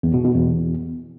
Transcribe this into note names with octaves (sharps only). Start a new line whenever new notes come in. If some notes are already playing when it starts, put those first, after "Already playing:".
E2
B2
B2
E2